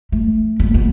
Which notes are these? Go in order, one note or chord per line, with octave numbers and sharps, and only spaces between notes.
A3
B3
B3